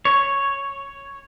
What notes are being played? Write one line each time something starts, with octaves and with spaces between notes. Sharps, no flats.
C#5